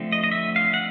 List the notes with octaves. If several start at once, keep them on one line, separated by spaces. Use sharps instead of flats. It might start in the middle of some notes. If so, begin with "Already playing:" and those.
Already playing: D3 F3 A3 C4
D#5
D#5
E5
F5
F#5